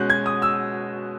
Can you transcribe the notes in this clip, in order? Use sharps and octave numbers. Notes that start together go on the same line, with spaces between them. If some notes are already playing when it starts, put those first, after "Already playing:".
Already playing: B2 G#3 C#4 F#6 G6
G#6
D#6
E6